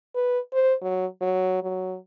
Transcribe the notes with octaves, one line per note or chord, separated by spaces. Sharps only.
B4
C5
F#3
F#3
F#3